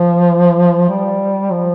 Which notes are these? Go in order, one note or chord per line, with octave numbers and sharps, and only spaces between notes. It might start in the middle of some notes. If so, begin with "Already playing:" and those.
Already playing: F3
G3
F3